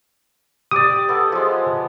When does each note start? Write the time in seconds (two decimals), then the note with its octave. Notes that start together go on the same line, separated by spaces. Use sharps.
0.71 G4 D5 D6 D#6
1.08 B3 A4
1.32 F3 G#3